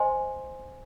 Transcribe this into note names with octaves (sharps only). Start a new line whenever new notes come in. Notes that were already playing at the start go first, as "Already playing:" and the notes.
Already playing: C5 D#5 G#5 C6